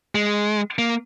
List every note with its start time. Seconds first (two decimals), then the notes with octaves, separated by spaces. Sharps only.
0.15 G#3
0.79 A#3